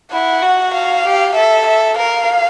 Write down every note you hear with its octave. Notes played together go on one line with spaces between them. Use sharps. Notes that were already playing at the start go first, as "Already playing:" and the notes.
E4 F#5
F#4
F5
G4
A4 E5
E5
A#4 F5